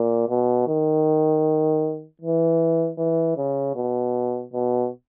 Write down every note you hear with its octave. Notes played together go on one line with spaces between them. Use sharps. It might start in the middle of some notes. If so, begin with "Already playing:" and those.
Already playing: A#2
B2
D#3
E3
E3
C#3
B2
B2